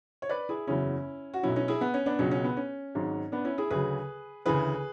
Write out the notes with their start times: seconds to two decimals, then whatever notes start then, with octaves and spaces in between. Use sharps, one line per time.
0.22 C#5
0.29 B4 D5
0.49 E4 G#4
0.67 F#1 E2 C#3 F#3 C#4 E4
1.34 F#4
1.43 B1 B2 F#3 C#4 E4
1.56 C#4 E4
1.68 E4 G#4
1.81 B3
1.94 C#4
2.06 B3 D4
2.19 C#2 B2 F#3 C#4
2.31 C#4
2.44 B3
2.57 C#4
2.95 G#1 G#2 F#3
3.32 B3 D4
3.45 C#4 E4
3.58 E4 G#4
3.70 D2 C#3 F#3 G#4 B4
4.46 D2 C#3 E3 G#4 B4